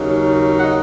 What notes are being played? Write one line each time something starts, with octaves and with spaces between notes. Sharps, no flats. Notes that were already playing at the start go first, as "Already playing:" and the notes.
Already playing: D#2 C#3 F#3 D#4
F#5
D#5